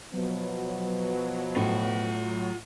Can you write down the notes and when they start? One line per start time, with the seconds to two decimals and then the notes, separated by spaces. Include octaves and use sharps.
0.13 B2 F3 F#3 B3
1.56 A2 F4 F#5